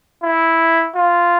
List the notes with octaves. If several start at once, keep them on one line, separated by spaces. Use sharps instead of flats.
E4
F4